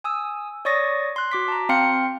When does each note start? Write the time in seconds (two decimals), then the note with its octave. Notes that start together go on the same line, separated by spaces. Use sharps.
0.04 G#5 D#6 E6
0.65 C#5 D5 C#6 D#6 A6 A#6
1.16 C6 F#6
1.32 F#4 D6 B6
1.48 A5 A#5
1.69 C4 F5 G5 C6 F6 C#7